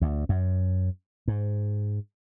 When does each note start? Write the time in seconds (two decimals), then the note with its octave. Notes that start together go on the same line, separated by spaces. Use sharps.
0.02 D2
0.29 F#2
1.28 G#2